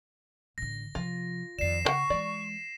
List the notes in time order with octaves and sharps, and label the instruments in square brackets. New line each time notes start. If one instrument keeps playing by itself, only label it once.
[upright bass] A1 D3 [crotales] A#6
[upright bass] C3 F3 [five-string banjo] F4
[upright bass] F2 D#3 [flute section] D5 [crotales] C7 E7
[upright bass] C#3 [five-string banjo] D4 F#5 [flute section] C#6
[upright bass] E3 G#3 [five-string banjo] D5